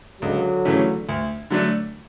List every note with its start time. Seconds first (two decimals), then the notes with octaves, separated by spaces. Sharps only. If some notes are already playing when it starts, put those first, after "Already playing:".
0.22 C#2 D3 F#3
0.65 C#3 E3 A3 C#4
1.09 D2
1.50 D3 F#3 A3 D4